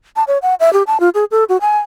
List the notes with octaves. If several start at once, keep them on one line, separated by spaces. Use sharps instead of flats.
A5
C#5
F#5
E5
G4
A5
F4
G#4
A4
F#4
G#5